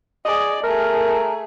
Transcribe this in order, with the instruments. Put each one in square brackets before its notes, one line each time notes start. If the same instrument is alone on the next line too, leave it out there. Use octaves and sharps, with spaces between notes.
[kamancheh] G#4 D5 [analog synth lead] D#5
[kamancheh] A3 G#4 [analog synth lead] A#4